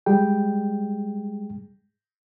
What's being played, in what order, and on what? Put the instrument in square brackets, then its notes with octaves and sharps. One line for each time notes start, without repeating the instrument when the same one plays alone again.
[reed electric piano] G3 G#3 G#4 G5